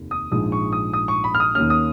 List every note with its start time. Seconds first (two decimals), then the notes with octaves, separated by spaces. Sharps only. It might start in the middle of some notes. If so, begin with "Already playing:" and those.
Already playing: F1 D#2
0.11 D#6
0.31 A#1 G#2 F3 G#3 D#6
0.52 C#6
0.72 D#6
0.93 D#6
1.08 C#6
1.24 B5
1.35 F6
1.40 D#6
1.55 D#2 D#3 A#3 C#4 F6
1.70 D#6